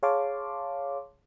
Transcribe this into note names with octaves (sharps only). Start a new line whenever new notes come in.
G#4 C#5 F5 A5 C6 D6